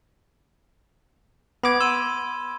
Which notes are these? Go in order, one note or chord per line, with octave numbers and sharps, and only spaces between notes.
B3 B5 D6 G#6
C6 E6 D#7